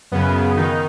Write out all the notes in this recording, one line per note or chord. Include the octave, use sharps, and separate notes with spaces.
F#2 C#3 B3
D#3 D#4